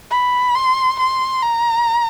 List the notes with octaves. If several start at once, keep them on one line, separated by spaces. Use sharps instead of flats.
B5
C6
C6
A#5